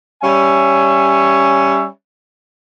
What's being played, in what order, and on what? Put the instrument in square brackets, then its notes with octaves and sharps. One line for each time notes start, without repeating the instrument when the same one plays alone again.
[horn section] G3 C#4 C#5 E5 G#5